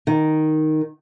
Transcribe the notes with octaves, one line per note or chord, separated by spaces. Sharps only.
D#3